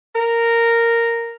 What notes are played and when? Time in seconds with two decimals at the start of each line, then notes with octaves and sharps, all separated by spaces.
0.15 A#4